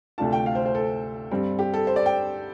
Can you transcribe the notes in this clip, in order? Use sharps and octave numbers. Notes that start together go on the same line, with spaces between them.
D2 C3 A3 D4 F4 A5
G5
F5
C5
C5
A4
G2 G3 C4
G4
A4
C5
D5
G5